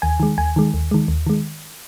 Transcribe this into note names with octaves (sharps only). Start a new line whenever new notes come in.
D#2 G#5
D#3 G#3
D#2 G#5
D#3 G#3
D#2
D#3 G#3
D#2
D#3 G#3